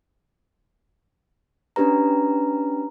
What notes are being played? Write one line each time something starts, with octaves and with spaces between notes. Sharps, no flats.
C#4 D4 G4 B4 A#5